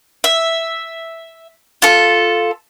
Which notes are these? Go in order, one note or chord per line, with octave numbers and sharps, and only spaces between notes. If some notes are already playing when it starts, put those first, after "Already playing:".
E5
F4 A4